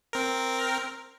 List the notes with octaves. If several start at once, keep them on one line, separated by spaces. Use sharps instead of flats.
C4 A#4